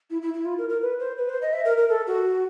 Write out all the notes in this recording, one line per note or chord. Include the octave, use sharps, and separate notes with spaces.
E4
E4
E4
F4
A#4
A#4
B4
C5
B4
C5
D#5
E5
A#4
A#4
A4
F#4